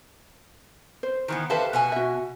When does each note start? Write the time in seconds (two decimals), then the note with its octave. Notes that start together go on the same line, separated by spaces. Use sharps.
1.03 C5
1.28 D#3 E3 B3
1.50 G4 A4 B4 C5 E5 F5
1.73 B2 F#5 G#5
1.92 F#4 E5